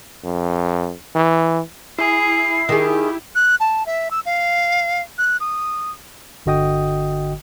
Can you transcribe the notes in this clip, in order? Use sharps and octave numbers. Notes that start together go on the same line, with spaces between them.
F2
E3
E4 G#4 C7
D#3 G4 G#4
F#6
A5
E5
E6
F5
F#6
D#6
G1 D3 F#4 D#5 G5 D#6